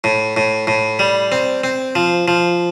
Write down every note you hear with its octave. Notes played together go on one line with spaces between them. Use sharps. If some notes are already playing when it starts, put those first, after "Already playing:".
A2
A2
A2
G3
C4
C4
F3
F3